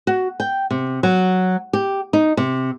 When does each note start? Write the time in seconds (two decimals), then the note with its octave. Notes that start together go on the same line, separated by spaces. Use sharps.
0.07 F#4
0.40 G5
0.71 C3
1.03 F#3
1.73 G4
2.13 D#4
2.37 C3